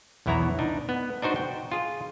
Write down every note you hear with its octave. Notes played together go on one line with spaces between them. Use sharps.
B1 E2 B3 E4 C#5 A#5
D4 D#4
B3
D4 D#4 F#4 C5
G5
F4 G#4